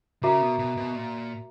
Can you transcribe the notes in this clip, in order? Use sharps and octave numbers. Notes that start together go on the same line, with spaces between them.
C#3 F#4 A#4 E5 A#5 D6
B2
B2
B2
A#2